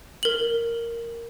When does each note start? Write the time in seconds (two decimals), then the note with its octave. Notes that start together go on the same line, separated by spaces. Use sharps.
0.23 A#4 F#7